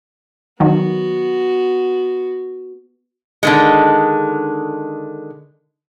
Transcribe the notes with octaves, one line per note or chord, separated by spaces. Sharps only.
D#3 F#3 B3 F#4
D3 D#3 G#3